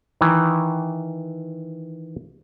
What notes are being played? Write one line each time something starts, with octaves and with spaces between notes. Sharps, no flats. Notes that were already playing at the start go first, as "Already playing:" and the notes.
D#3 E3